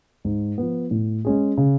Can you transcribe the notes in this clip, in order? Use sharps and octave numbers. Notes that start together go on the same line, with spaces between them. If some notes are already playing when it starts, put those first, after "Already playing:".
G#2
F3 B3
A2
G#3 C#4 G#4
C#3